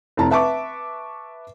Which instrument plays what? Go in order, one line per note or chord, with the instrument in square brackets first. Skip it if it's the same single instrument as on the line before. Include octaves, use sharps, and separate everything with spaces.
[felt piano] F1 E4 A5 A#5
B4 E5 A5 C#6 D6